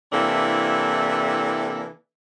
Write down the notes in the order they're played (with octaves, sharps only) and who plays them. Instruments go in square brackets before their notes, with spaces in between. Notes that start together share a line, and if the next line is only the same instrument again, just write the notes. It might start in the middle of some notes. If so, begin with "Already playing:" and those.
[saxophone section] C3 E3 A#3 D4 E4 A4